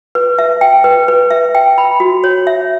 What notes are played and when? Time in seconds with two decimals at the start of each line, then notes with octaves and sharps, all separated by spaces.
0.15 B4
0.38 E5
0.61 G5
0.84 B4
1.08 B4
1.30 E5
1.55 G5
1.78 B5
2.00 F#4
2.24 C#5
2.47 E5